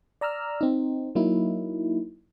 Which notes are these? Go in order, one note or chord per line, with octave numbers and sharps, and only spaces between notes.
D5 A#5 E6 F6
C4 D#4
F#3 A#3 D#4 E4